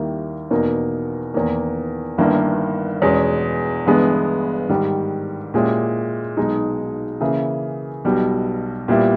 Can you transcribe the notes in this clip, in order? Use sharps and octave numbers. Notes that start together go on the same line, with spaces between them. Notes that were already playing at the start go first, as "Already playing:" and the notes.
Already playing: D#2 D#3 G3 A#3 E4
E2 B2 A#3 D#4 A#4
E2 D#3 A#3
G1 G2 D#3 A#3 E4
E2 B2 G#3 C#4
G1 G2 E3 G#3 B3
G#2 D#3 G3
A#2 G#3 C#4 E4 G4
B1 B2 G#3 D#4
C#3 E3 A#3 E4 G#4
B1 B2 G3
A#2 G3 B3 E4